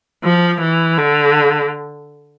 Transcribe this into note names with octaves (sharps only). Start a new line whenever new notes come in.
F3
E3
D3